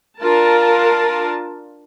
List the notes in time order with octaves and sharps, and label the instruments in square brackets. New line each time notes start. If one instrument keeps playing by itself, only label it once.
[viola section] D4 F4 A#4 A5